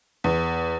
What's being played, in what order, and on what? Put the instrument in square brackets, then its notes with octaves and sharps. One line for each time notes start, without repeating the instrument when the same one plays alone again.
[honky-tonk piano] E2